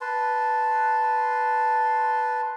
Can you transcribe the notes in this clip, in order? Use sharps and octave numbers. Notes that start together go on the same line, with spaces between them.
B4 A5 C6